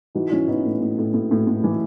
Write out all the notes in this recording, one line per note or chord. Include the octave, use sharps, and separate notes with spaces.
E3 D#4 F#4
E3 C#4 E4
E3 B3 D#4
A2
A2
A2
A2
A2
A2
E3